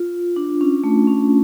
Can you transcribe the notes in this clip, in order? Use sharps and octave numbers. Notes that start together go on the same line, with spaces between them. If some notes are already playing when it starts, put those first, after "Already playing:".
Already playing: F4
D4
C#4
A3
C#4